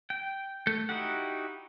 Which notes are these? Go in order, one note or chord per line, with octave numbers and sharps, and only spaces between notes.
G5
A3 A4 G6
D#4 E4 F#4 G4 F#5